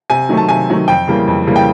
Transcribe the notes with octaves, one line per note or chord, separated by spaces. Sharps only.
C3 G#5
D#3 F#3 A3
A5
C3 G#5
D#3 F#3 A3
F2 G5
C#3 E3 G3 A#3
F2
C#3 E3 G3 A#3
G5